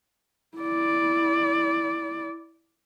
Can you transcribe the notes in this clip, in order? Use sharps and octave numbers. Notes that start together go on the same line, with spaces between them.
E4 D5